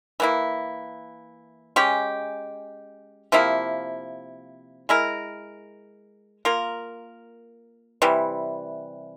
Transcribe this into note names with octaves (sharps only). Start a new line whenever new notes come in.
E3 A#3 E4
G#3 C#4 G4
C3 F3 A#3 E4
G#3 E4 A#4
A#3 F4 A#4
C3 E3 G3